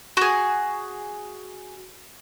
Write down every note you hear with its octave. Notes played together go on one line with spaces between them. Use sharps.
F#4 G#4